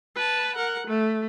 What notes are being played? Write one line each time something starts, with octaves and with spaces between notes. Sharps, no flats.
B4 A5
A#4 F#5
A3